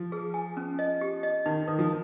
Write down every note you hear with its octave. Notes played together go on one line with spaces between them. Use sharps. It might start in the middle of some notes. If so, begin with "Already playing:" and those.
Already playing: F3
G#4
G#5
C#4
D#5
G4
D#5
D#3 D#4
D#3 A#4
F3